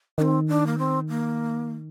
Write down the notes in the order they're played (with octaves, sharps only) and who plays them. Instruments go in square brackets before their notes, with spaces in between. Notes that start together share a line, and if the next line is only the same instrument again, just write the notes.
[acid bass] D#3 [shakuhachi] D4
[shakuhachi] C4
D4
A#3
C4
A#3